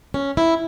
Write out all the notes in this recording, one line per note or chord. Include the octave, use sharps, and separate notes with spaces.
C#4
E4